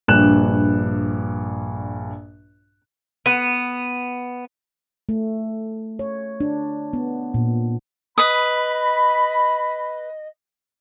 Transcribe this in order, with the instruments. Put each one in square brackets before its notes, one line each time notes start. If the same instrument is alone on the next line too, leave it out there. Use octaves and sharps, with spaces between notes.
[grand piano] A#1 G2 F#6 E7
[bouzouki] B3
[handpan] A3
C#5
D4
B3
A#2
[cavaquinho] B4 D#6 [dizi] D#5 [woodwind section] B5